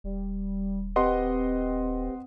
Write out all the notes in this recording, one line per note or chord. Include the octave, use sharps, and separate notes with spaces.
D#1 G3
C4 G4 B4 D#5 F#5 C6